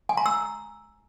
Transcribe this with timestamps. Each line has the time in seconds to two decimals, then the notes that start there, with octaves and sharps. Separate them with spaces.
0.09 G#5
0.17 A#5
0.26 E6